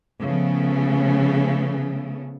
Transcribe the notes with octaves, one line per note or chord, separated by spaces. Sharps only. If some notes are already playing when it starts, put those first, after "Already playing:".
C#3 F3 A3 B3